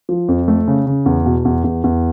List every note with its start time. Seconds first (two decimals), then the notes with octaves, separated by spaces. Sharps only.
0.09 F3
0.28 F2
0.48 A3
0.68 C#3
0.87 C#3
1.06 E2
1.26 B2
1.45 E2
1.64 E2
1.84 E2